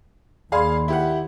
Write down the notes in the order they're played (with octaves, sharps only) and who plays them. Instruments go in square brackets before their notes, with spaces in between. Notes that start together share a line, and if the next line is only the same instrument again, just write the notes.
[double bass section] D#2 [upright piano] G#4 F5 [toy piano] D5 B5 C6
[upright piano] E4 G4 F#5